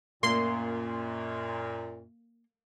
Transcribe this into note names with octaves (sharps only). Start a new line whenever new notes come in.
F#2 A#2 A#3 C6